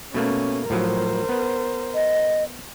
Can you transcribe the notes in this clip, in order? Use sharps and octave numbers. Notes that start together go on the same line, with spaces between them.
B2 A3 A#3 C#4
A2 F3 F#3 A#4 C5
B3 B4
D#5